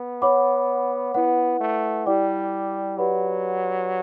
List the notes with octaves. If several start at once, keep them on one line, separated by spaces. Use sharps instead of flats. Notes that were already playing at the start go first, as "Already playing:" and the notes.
Already playing: B3
C#5 F#5 B5 D6
B3 E4 B4 F#5
A3
G3 E4 G4 D5 G5 D6
F#3 G4 B4 D5 F#5 B5